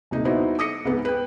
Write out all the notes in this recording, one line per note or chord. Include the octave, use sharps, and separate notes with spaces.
D#1 C3 D#4
B3 D#4 E4 F#4 C5
D6 D#6 A#6 C#7
C#2 G#2 B3
B4 G5